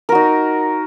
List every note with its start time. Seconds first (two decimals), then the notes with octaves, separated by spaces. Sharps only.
0.09 A#4
0.12 F#4
0.15 D#4